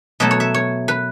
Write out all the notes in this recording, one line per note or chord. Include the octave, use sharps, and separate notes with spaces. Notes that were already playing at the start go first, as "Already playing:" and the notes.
B2 F#3 A3 E5
C#5
E5
C#5
B4